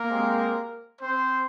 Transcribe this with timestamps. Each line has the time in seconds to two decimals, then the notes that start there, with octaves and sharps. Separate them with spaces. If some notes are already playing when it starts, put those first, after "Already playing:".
Already playing: A#3 A#4
0.08 G#3 C4 G4
1.01 C4 C5